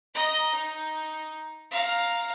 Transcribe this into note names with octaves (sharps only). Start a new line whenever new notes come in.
D#5 A#5
D#4
F5 A#5